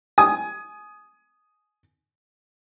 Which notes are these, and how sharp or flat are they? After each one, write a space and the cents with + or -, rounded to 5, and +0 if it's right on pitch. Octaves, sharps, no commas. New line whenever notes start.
G#5 +20 D#6 +0